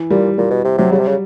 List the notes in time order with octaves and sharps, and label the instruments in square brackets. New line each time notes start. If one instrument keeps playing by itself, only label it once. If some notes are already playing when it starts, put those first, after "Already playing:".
Already playing: [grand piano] E3
[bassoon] A#2 [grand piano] G3
[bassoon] A#2 [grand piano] G3
[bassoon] B2
C3
[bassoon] C3 [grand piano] F#3
[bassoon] C#3 [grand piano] G3
[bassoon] C3
C#3